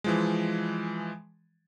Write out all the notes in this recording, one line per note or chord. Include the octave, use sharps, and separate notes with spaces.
E3 F3 G#3